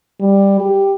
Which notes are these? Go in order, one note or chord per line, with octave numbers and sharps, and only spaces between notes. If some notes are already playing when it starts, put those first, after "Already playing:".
G3
G4